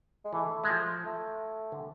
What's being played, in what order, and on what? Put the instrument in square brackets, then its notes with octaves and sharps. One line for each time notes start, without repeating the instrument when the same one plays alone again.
[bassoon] G#3
[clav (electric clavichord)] E3 [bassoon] A3
[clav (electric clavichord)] G#3
F3
[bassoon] A3
[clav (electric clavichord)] D3